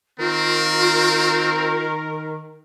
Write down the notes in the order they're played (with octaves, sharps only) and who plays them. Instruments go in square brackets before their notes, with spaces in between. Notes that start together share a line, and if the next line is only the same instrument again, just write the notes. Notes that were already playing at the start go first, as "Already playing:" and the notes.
[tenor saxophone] D#3 [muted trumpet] C4 [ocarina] F4 [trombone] A#4